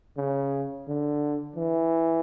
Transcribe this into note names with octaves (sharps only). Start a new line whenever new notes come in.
C#3
D3
E3